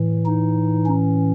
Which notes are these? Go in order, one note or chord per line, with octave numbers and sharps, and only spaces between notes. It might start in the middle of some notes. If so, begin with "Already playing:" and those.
Already playing: A2 E3
D#4
C#4